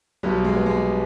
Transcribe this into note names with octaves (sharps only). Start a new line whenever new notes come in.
B1 B2 G3
G#3
B3
G#3